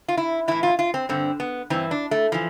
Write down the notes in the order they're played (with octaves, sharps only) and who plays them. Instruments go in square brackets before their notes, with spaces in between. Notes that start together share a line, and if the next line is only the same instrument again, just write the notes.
[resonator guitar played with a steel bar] F4
E4
A2 E3 E4
F4
F4
C4
G2 D3 C4
B3
G2 E3 C4
D4
A3
E3 F3